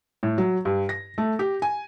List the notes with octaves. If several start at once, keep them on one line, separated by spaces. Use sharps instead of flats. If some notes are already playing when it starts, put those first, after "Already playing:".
A2
F#3
G2
A#6
A3
G4
G#5